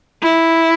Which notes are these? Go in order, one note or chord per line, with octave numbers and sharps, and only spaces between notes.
E4